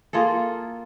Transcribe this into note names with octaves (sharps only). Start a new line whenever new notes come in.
A#3 F4 G#4 A4